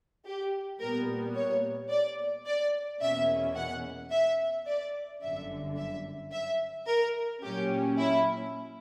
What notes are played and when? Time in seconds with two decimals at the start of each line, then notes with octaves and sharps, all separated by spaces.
0.26 G4
0.80 A#2 G3 B3 A#4
1.35 C#5
1.90 D5
2.46 D5
3.00 E2 B2 A#3 C#4 E5
3.55 F#5
4.11 E5
4.66 D5
5.21 G1 F#2 D3 E5
5.77 E5
6.32 E5
6.87 A#4
7.43 A#2 F#3 C#4 G4
7.98 E4